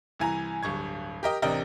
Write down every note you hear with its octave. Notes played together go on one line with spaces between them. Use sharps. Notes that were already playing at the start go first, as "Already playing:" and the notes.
C2 E3 G#5 A#5
D1 G2 C#6 G#6
G4 A#4 D#5 G5
A1 C3 D4 A#4 D#5 G5